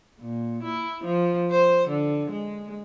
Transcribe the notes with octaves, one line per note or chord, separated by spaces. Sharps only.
A#2
E4
F3
C5
D3
G#3